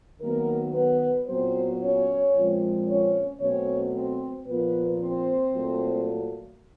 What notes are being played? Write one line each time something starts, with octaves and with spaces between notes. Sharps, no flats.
D#3 F#3 A#3 B3 A#4
B3 B4
A#2 F#3 B3 C4 C5
C#4 C#5
A#2 F3 G#3 C4
C#4 C#5
B2 F#3 A3 C4 C#4 C#5
C4 C5
A#2 F3 A#3 B3 B4
C4 C5
A#2 F#3 A3